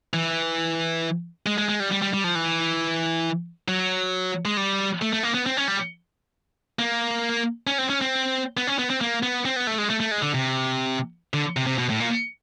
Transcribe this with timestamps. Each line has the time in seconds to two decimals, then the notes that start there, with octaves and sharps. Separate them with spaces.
0.14 E3
1.46 G#3
1.58 G#3
1.69 G#3
1.80 G3
1.92 G3
2.02 G3
2.13 G3
2.24 F3
2.35 E3
3.68 F#3
4.45 G#3
4.57 G3
5.02 A3
5.13 A3
5.23 A#3
5.34 B3
5.46 C4
5.57 C#4
5.68 G3
6.79 A#3
7.67 C#4
7.78 C4
7.90 C#4
8.01 C4
8.57 B3
8.67 C#4
8.79 B3
8.90 C4
9.01 A#3
9.23 B3
9.46 C4
9.56 B3
9.67 A3
9.78 G#3
9.90 A3
10.00 A3
10.11 G#3
10.22 D3
10.34 C3
11.34 D3
11.57 C3
11.67 C3
11.78 B2
11.90 A2
12.00 A#2